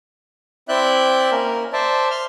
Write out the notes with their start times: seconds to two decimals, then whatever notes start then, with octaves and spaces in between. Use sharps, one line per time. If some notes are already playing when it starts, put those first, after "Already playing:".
0.69 C4 E4 D5 E5 F#6 G6
1.32 A#3 C#4 A#4
1.73 C5 D5 E5 A5
2.10 C6 F6